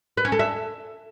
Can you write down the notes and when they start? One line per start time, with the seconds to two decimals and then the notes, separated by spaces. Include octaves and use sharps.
0.17 B4
0.25 C#4
0.32 A4
0.39 E5